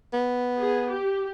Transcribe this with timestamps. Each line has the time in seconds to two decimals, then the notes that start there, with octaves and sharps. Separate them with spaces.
0.13 B3
0.60 G#4
0.90 G4